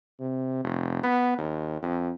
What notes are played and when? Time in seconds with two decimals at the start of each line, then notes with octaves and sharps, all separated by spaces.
0.19 C3
0.64 F1
1.03 B3
1.38 D#2
1.82 F2